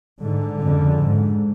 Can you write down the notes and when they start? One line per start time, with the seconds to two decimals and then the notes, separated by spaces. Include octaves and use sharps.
0.22 G#2 D3
0.61 F2 C#3
0.99 G#2